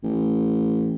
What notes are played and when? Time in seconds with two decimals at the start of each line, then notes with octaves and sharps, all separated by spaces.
0.03 A1